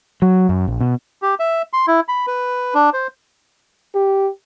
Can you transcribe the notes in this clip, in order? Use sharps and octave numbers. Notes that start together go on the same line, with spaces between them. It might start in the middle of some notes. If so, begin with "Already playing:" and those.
F#3
F#2
A#1
B2
G4
E5
C6
E4
B5
B4
D4
C5
G4